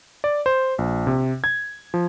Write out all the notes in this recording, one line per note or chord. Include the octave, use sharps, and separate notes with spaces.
D5
C5
A#1
C3
G#6
F3